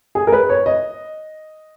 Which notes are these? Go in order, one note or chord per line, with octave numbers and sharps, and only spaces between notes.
G#4
A#4
B4
C#5
D#5